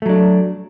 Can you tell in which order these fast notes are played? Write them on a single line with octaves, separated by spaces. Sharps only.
A3 F#3 D4